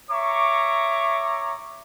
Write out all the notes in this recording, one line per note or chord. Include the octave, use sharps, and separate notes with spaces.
C#5 E5 A#5 C#6 D6